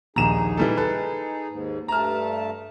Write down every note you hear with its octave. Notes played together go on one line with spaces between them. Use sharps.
A#1 D#2 D#4 G#4 A#5 E7
E3 G3 A4
A4 B4
D#2 G#2
G2 A3 A5 A#5 F6